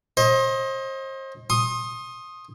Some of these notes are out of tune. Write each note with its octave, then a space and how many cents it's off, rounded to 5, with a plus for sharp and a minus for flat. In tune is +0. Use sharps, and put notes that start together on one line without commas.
C5 +35 D#5 +20
C6 +35 D#6 +0